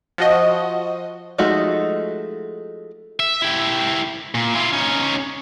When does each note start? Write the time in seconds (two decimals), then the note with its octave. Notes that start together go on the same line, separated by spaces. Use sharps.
0.18 F3 F#4 D#5
1.38 F3 G#3 A3 D#4 F#4
3.20 E5
3.42 E4 G4
4.35 A#2
4.54 E4 F4
4.73 C#4 D#4